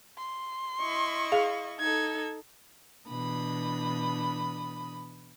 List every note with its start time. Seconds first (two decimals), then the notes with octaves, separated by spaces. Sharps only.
0.18 C6
0.80 E4 D#5 C#6
1.32 G#4 F5
1.79 D#4 A4 G#6
3.08 B2 E3 D4 B5 D#6